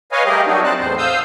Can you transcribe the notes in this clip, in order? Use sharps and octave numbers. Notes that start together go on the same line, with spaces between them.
B4 C#5 D#5 F5 G#5
G3 A3 G4 G#4 A#4 D#5
F#3 C4 D4 D#4 F#4
C4 C5 A5 F#6
E2 A2 C5
F5 D#6 E6 G6